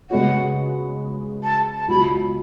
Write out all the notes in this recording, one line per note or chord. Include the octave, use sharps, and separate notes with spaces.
C#3 G#3 B3 F#4 C#5 F#5
A5
A5
C#2 B2 F#3 B5